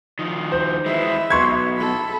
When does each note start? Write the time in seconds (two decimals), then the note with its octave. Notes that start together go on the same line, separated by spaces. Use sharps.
0.19 D#3 F3
0.52 C5
0.86 E3 G#3 B4 E5
1.30 B1 B2 C6 C#6 G#6
1.77 A4 B5